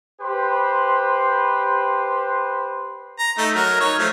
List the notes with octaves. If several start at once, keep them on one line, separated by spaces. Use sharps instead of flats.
G4 B4 C5 B5 C6
A#5
A3 D#4
F#3 A#4
D#4 C#5
F3 A3